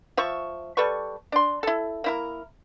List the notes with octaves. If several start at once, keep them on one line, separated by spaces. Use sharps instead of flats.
F3 E5 C#6
G3 A4 B4 C#6
D4 C6
E4 A4
A#3 E4 A#4